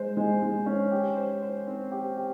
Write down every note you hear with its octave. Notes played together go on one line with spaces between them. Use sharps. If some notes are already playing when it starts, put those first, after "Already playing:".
Already playing: G#3 C5
G#3
G#3
C#4
G4
C5
C5
C4
G4
G4